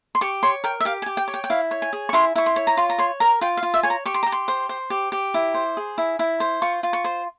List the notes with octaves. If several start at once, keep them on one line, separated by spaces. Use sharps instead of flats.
C6
G4 C#6
C#5 C6
A#4 G5
E5
G4 F5
G#5
G4
G5
C#5
G5
G5
E4 F5
C#5
G#5
G#4
C#6
E4 C6
E4 C#6
C6
C#5
A#5
F4 C6
A#5
C#5 C6
A#4 A#5
F4 G5
F5
F4
E5
C#5 G#5
A#5
G4 C#6
C6
G4 A#5
C6
C5
C5
G4
G4
E4
C5
G#4
E4
E4
C5
F4 C#6
F4
C#6
C5